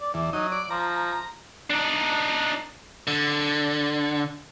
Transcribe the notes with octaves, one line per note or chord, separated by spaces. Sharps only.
D5
E2 D5
F#3 D#4
D5
F3 A#5
D4 D#4
D3